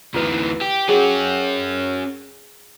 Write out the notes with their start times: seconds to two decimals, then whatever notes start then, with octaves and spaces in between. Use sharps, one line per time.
0.14 D2 E3 E4 B4
0.61 G4
0.89 C#4 F#4 G#4 G5